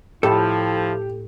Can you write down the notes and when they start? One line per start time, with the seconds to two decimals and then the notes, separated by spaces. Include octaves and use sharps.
0.23 A2 F3 E4 G4 A4 A5